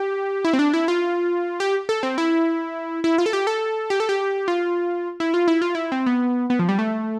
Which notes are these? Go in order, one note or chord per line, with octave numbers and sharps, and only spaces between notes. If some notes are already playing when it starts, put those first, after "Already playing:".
Already playing: G4
E4
C4
D4
E4
F4
G4
A4
C4
E4
E4
F4
A4
G4
A4
G4
A4
G4
F4
E4
F4
E4
F4
E4
C4
B3
B3
F3
G3
A3